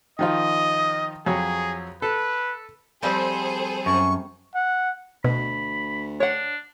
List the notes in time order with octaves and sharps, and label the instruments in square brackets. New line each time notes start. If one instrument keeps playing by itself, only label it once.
[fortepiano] D#3 F3 F4 [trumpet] D#5
[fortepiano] F2 F#3 C#5 [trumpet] G#4
[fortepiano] A4 [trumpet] B4
[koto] F3 G3 C4 [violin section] G#4 A4 C5
[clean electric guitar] F#2 [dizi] C#6
[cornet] F#5
[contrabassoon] D2 [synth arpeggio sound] B2 [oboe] B5
[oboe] D4 [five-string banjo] C#5 F#5